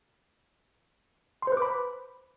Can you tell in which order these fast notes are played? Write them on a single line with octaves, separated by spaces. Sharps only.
C6 C5 B4 D6 B5